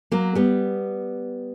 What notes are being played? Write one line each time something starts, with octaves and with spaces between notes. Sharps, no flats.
F#3 A#3
G3 B3